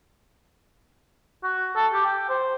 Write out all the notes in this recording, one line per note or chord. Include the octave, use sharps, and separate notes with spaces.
F#4
A4
G4
G5
C5